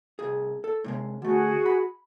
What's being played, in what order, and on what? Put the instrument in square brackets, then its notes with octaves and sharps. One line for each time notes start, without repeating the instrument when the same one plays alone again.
[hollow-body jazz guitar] C2 G#4
A4
A2 C3 G#3
[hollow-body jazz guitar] D3 A3 [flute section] F#4 G#4
[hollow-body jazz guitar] B5